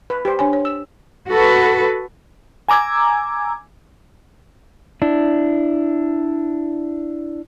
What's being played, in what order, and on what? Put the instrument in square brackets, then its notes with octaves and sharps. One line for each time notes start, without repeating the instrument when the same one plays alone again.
[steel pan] B4
G4 C5
[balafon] D4 C#5 G#5
C#5
[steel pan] E6
[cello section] F#4 A4 B4
[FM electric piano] G#5 A#5 D6 E6 G#6
[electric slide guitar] D4 E4